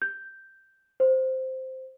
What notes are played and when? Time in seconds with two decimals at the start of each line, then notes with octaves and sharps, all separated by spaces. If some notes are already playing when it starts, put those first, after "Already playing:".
0.02 G6
1.00 C5